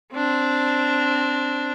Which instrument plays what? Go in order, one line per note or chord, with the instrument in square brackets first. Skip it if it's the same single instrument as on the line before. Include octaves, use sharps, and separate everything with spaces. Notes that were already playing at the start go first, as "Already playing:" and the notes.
[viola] C4 D4